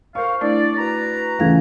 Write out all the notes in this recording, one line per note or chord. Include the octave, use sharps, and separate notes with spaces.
A#4 C5 F5 C#6
A3 D4 E4 D5
F#4 B4 A#5
D#2 C#3 E3 A3 F5 G#6